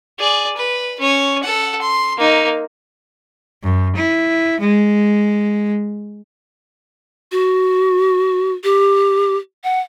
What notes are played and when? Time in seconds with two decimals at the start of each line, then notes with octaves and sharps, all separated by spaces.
0.19 G#4 D5
0.57 B4
1.00 C#4 C#5
1.43 A4 F#5
1.81 C6
2.18 A#3 D#4
3.63 F#2
3.96 E4
4.60 G#3
7.32 F#4
8.64 G4
9.64 F#5